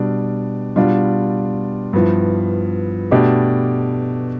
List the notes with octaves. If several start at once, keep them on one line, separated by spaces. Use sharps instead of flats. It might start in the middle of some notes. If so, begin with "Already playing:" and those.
Already playing: B2 G3 D4
B2 G3 D4 F4
G2 F3 B3 E4
B2 A3 D4 G4